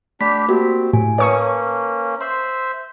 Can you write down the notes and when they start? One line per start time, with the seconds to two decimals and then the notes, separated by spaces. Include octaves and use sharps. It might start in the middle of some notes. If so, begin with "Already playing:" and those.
0.21 A3 D4 G4 B5 B6
0.48 A#3 C4 F#4 G4
0.93 A2 G#5
1.18 A#3 C#4 B4 C#5 A5 C#6 D#6
2.21 C5 E5 C6